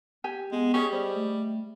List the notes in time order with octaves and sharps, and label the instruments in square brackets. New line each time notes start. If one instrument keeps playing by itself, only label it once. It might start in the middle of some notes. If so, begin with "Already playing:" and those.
[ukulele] G4 G#5
[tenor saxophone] G#3 [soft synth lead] B3
[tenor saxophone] C#4 [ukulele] G4 G#4 D#5
[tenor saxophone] G3 [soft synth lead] C5
[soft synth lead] A3